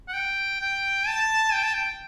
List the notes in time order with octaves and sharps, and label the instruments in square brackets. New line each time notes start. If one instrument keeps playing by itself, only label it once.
[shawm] F#5
G5
G5
A5
G5
A5
G5